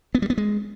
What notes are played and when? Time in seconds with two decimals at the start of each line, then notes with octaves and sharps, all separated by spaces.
0.15 B3
0.22 G3
0.30 B3
0.38 G#3